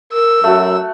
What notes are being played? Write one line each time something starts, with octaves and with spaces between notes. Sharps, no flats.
A#4 E6
F#2 A3 F#4